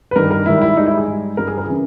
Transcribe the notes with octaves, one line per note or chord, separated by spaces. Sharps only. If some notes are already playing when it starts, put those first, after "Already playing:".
B4
G2 D#3 G3 A#4
A#4
G#2 D#3 G3 E4
E4
G#2 G3 D#4
E4
G#4
G#2 G3
G2 G3 A#4
G#4
A#4
G#4
C#3 E3